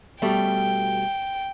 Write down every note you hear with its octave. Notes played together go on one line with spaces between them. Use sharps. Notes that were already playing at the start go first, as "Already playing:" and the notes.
B2 G3 A3 G5